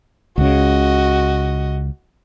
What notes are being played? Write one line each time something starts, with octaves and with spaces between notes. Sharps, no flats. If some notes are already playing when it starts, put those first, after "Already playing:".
C#2 C#3 F#4 D#5